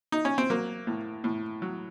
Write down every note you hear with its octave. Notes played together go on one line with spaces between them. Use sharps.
D#4
C#4
C4
F#3 A#3
A2
A2
F#3